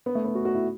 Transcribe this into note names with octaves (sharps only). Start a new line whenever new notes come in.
B3
A3
B3
F#4
F#4
E4